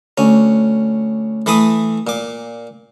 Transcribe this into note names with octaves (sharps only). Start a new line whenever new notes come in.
D2 C#4
E3 A3 B5 C6 D6 D#6
A#2 D6